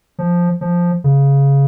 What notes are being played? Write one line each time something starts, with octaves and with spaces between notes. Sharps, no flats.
F3
F3
C#3